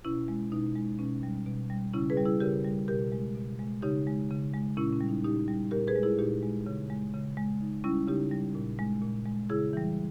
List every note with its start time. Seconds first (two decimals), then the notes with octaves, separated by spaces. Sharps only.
0.05 B2 C#4 E4
0.28 G#3
0.52 B2 D#4
0.75 G#3
0.99 B2 C#4
1.23 G3
1.46 B2
1.70 G3
1.93 C#3 C#4 E4
2.10 G#4 B4
2.17 G3
2.26 E4 G#4
2.40 C#3 G4 A#4
2.64 G3
2.88 B2 G4 A#4
3.12 G#3
3.35 B2
3.59 G#3
3.82 C#3 D#4 G4
4.07 G#3
4.30 C#3
4.54 G#3
4.77 A#2 C#4 E4
4.93 C#4
5.01 G3
5.09 D#4
5.24 A#2 D#4 G4
5.48 G3
5.71 A#2 G4 A#4
5.88 G#4 B4
5.96 G#3
6.03 E4 G#4
6.19 A#2 D#4 G4
6.43 G#3
6.66 C#3
6.90 G#3
7.14 C#3
7.37 G#3
7.61 C#3 D#4
7.84 G3 C#4 E4
8.08 C#3 D#4 G4
8.32 G3
8.55 A#2
8.79 G#3
9.02 A#2
9.26 G#3
9.50 C#3 E4 G#4
9.73 E3 G3